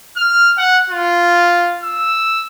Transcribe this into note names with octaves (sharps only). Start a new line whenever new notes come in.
F6
F#5
F4
E6